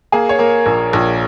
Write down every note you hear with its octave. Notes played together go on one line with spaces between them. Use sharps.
A#3 G#4
C#5
A#3 A#4
A#1
A#1